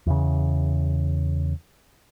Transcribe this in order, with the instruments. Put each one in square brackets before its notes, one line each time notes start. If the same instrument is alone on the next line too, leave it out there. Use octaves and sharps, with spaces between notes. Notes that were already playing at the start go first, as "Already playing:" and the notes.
[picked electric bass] E2 C#3